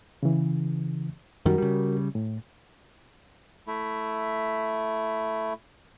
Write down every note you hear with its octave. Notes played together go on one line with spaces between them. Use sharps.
C#3 E3
F#2 D#3 G3 F#4 A#4
C#3 G3
A2
A3 E4